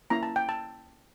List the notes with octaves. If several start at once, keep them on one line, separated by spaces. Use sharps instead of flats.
A#3 C#4 E4 A#5
A5
G5
A5